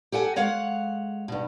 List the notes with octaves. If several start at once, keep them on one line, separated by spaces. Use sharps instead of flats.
G4 A4 F#5 G#5
G#3 C#5 F5 F#5
G2 B2